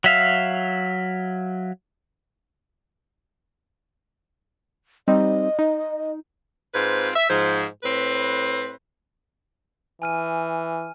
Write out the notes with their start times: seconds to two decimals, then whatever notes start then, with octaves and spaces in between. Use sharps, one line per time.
0.04 F#3 E5 F5
5.08 G3 C4 D#4 D#5
5.59 D#4
6.74 G#2 C4 F4 B4
7.14 E5
7.29 G#2 F3
7.83 A2 C4 B4
10.02 E3 G#5 F6 D#7